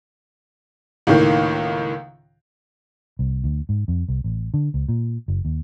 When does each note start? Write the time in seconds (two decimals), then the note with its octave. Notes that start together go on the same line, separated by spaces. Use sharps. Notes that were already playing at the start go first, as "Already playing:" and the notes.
1.07 C#2 A2 D#3 A#3
3.19 C2
3.44 D2
3.69 G#2
3.88 F2
4.08 C2
4.24 A1
4.54 D3
4.74 C#2
4.89 A#2
5.28 F#1
5.45 D#2